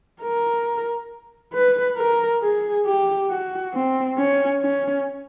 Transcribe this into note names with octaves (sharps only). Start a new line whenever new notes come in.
A#4
B4
A#4
G#4
G4
F#4
C4
C#4
C#4